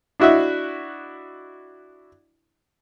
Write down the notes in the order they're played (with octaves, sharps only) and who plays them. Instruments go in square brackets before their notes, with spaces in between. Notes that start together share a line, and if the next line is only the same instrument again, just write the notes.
[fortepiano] D4 E4 F#4 D#5 E5